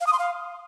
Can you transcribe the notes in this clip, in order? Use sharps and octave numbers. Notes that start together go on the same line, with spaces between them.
F5
D#6
C6
F5